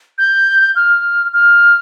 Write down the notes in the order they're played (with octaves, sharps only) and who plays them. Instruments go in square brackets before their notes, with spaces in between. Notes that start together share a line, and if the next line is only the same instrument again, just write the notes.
[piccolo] G6
F6
F6